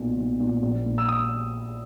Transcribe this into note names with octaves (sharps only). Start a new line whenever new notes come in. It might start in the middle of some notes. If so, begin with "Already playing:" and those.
Already playing: B1 A#2
B1
A#2
A#1
A#2
E6
D#6